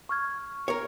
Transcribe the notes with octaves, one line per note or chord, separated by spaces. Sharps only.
C#6 F6 G#6
A#4 C#5